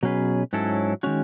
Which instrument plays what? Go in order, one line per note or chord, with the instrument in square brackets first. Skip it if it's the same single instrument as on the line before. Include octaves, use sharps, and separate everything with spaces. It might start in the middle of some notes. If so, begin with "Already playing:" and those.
[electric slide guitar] B2 F#3 C#4 G#4 B4
G#2 F#3 C#4 E4 A4
D#3 G#3 C#4 F#4